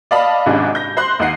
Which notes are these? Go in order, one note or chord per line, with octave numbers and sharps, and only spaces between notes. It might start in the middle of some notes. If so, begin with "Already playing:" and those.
D5 D#5 F5 A5 B5
G#1 G#2 C3 C#4 D4
G6 A#6
C5 C6 F#6
D#2 D#4 F#5 C7